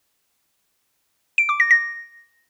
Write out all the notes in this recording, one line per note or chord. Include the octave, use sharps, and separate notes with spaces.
D7
D6
A#6
A#6